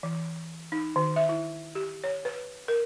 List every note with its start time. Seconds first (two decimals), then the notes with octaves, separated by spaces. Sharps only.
0.03 E3
0.72 D#4
0.96 D#3
1.16 E5
1.29 E4
1.75 G4
2.04 C#5
2.25 B4
2.68 A#4